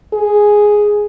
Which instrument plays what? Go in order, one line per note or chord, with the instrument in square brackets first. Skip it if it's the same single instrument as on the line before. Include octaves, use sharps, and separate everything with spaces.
[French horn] G#4